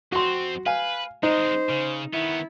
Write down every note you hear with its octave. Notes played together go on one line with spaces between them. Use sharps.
F2 C4 F#4 C6
B4 F5 G#5
G#3 C4 D#4 C5
C#3
D#3 B3 E4